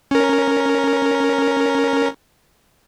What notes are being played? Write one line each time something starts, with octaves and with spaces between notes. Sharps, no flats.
C#4 A#4